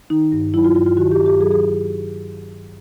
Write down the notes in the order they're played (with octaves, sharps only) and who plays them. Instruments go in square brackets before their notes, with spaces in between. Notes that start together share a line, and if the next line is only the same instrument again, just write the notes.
[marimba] D#3 D#4
G2
F#3 E4
F4
G2 F4
F4
D#3 F#4
G4
G2
G4
F#3 G#4
G#4